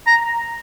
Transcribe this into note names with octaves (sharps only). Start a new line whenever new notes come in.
A#5